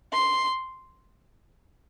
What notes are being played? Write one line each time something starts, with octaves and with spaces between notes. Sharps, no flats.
C6